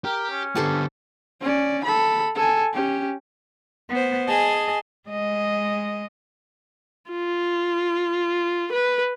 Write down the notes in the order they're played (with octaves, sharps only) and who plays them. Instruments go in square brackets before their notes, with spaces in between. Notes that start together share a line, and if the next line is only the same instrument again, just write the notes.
[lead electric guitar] G4 [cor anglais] A#4
[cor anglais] C#4
[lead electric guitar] D3 B3 [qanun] G4 A4 C5
[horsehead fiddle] C#4 D5
A4 B5
A4 G#5
C#4 G4
[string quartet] B3 C5
G#4 D#5 G#5 A5
[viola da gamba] G#3 D#5
[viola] F4
B4